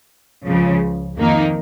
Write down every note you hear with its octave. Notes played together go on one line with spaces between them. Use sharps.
C#2 C#3 F3
F2 D#3 A#3 D#4